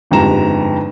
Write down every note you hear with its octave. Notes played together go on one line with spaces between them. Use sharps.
G1 F2 G#2 G3 A#5 E7